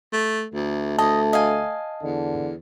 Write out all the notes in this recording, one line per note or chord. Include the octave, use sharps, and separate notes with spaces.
A3
D2 A3
D2 D#5 A5
D#5 F5 G#5
E2 D3